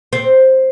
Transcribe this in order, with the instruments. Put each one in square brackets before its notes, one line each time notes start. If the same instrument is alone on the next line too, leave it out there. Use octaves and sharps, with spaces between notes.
[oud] C4